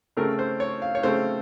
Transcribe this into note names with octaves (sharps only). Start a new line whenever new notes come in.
C#3 A3 C4 A#4
C5
C#5
F5
C#5
C#3 A3 C4 C5